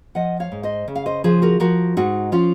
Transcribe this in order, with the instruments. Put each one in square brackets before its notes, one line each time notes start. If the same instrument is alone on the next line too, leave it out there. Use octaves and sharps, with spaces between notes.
[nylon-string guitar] F3 D#5 F#5
C#5 F5
G#2
C5 D#5
C#3
F5
C5 D#5
F3 G#4 C5
F#4 A#4
F3 F#4 A#4
G#2 D#4 F#4
F3 C#4 F4